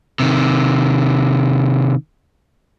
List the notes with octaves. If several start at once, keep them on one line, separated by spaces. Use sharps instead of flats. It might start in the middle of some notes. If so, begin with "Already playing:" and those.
C3 D#3